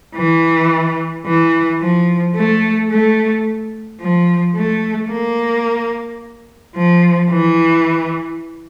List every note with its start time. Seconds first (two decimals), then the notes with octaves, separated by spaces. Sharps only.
0.16 E3
1.26 E3
1.81 F3
2.35 A3
2.91 A3
4.01 F3
4.56 A3
5.11 A#3
6.76 F3
7.31 E3